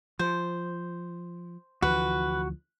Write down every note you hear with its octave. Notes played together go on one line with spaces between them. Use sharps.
F3 C5
D2 E3 F3 F#4 B4